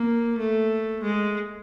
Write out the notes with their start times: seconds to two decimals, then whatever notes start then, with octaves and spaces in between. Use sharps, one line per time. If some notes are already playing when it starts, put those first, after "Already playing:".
Already playing: A#3
0.38 A3
1.03 G#3